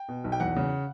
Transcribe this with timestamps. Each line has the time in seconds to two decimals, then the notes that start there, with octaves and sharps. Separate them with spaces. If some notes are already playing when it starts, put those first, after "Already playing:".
Already playing: G5
0.09 B2
0.24 B1
0.32 G5
0.40 E2 F#5
0.56 C#3